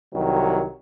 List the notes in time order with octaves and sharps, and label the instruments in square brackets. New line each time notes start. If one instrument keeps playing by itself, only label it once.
[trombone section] C2 D#3 F#3